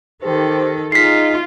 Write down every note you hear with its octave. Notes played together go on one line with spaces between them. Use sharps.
D#3 G4 A4 C5
D#4 F4 G#4 B6 C7